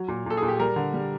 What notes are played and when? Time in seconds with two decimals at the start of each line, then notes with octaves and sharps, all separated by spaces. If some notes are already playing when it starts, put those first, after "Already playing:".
Already playing: F#3
0.08 A#2
0.26 A#2 A4
0.37 G#4
0.42 A#2
0.48 G4
0.60 G3 A#4
0.76 D3
0.94 G3